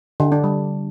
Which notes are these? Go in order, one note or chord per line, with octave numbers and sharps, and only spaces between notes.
D3
D4
G3